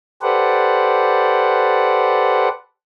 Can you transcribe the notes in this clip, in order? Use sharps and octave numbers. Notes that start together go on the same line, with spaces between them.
G4 A4 B4 C5 D5 F#5